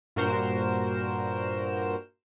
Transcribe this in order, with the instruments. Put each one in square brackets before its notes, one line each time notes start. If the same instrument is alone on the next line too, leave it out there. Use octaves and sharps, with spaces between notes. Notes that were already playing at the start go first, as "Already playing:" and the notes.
[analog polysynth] G2 A#2 F#4 A#4 C5 E7